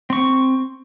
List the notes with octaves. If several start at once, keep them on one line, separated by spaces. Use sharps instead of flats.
C4 C#6